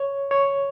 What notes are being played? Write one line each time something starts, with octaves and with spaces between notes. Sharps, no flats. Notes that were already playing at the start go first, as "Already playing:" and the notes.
Already playing: C#5
C#5